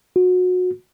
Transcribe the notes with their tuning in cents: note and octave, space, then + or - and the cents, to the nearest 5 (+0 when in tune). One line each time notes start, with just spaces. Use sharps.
F#4 -25